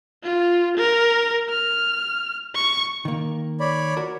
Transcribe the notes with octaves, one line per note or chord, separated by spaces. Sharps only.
F4
A#4
F6
C#6
D#3 A#3
C#5 D5 B5
F#4 A#4